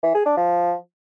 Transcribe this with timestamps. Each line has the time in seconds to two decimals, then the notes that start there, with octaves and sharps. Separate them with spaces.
0.03 E3
0.14 G#4
0.26 D4
0.37 F3